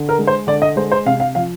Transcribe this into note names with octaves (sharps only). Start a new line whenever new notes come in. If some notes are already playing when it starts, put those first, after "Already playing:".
Already playing: D3
A#4
G#3
C5
D3 D5
D#5
G#3 C5
C5
C3 F5
F5
F3 F5